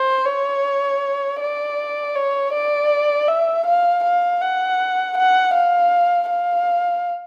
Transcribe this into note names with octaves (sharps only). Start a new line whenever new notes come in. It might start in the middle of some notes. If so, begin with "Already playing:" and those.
Already playing: C5
C#5
D5
C#5
D5
E5
F5
F5
F#5
F#5
F5
F5